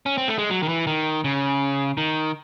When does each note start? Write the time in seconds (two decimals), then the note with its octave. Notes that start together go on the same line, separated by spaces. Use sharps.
0.06 C#4
0.18 C4
0.28 A3
0.38 G#3
0.50 F#3
0.63 D#3
0.68 E3
0.87 D#3
1.24 C#3
1.97 D#3